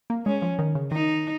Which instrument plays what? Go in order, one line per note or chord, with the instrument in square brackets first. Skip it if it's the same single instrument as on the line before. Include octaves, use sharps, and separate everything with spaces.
[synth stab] A#3
[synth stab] G#3 [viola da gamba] C#4
[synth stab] F3
D#3
C#3
[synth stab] D#3 [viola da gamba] D#4